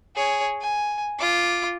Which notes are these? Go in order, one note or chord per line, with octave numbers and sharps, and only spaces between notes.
G#4 C#5
G#5
F4 D6